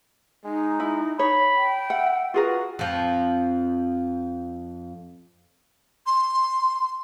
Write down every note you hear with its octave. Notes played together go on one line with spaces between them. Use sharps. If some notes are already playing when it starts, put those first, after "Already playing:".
G#3 D#4
E4
C#5 B5
G5
E5 F#5
F4 F#4 G#4 A#4 B4
F2 F3
C6